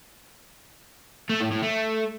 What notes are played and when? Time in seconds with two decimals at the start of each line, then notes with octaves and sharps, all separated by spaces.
1.30 A3
1.41 A2
1.52 A2
1.63 A3